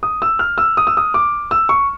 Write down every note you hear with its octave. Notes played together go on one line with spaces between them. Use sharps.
D#6
E6
F6
E6
D#6
E6
D#6
D6
E6
C#6